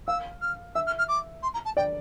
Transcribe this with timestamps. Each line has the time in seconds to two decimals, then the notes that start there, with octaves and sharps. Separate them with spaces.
0.07 F5 E6
0.41 F6
0.75 E5 E6
0.86 F6
0.98 F6
1.08 D6
1.43 C6
1.54 A#5
1.65 A5
1.77 D5 G5